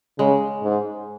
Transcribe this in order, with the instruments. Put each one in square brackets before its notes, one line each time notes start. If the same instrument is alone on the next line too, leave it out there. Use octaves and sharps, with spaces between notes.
[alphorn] C#3 [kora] G#3
[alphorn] G#2